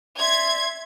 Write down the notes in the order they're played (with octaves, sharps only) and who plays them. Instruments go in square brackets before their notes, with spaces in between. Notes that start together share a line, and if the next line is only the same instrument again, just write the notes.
[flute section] D5 E5 C6 [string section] G#6